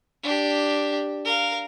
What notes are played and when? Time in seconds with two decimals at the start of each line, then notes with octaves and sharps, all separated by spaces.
0.23 D4 G4
1.25 A#4 F5